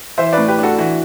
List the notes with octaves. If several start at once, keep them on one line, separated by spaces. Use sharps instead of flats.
E3 C5 E5
A2 B4 D5
G4 B4
D4 F#4 A4
E3 F#4